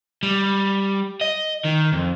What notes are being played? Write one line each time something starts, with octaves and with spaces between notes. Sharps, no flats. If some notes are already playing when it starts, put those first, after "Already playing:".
G3
D#5
D#3
F2